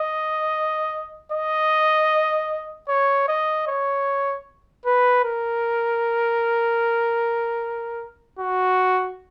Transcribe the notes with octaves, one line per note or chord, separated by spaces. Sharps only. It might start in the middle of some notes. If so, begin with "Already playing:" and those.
Already playing: D#5
D#5
C#5
D#5
C#5
B4
A#4
F#4